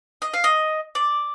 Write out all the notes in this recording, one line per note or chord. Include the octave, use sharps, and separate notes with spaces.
D#5
F5
D#5
D5